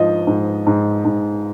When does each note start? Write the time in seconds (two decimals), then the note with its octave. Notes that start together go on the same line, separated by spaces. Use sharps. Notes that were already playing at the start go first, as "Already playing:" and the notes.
Already playing: G#2 F3 D#5
0.27 G#2
0.67 G#2
1.05 G#2